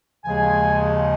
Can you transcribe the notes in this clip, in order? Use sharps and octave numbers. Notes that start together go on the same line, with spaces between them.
D#2 C#3 F3 G#3 G#4 G#5